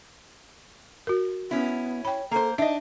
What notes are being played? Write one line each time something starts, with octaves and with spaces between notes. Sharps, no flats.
F#4 A#4
B3 C#4 E4
C#5 G5 B5
A#3 A4 C5
D4 D#4 D#5 E5